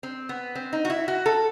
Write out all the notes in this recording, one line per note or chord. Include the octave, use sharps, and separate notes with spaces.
C4
B3
C4
D#4
F#4
E4
F#4
A4